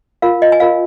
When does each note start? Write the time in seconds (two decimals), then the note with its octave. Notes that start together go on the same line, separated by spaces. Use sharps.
0.22 F4 A#4 F5
0.42 D#5
0.52 G#5
0.60 F4 A#4 F5